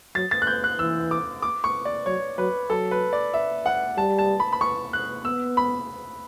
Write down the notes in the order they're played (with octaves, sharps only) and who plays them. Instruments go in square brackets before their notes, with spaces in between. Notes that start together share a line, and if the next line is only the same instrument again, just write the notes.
[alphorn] F#3 [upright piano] A6
[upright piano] A6
F#6
G6
F#6
[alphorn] E3 [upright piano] E6
[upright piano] D6
D6
C#6
D5
[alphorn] F#3 [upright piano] C#5
[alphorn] F#3 [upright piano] B4
[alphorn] F#3 [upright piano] A4
[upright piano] B4
D5
E5
F#5
[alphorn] G3 [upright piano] A5
[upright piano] A5
B5
B5
C#6
F#6
[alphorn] B3 [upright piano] E6
[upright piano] B5